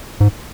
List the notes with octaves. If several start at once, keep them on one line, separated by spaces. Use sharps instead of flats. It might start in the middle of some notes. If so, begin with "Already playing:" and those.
G#2